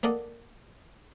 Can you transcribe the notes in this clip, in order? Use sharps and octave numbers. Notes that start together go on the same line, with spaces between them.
A#3 A4 D5 D#5 F#5